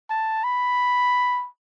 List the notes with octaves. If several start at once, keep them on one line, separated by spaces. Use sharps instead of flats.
A5
B5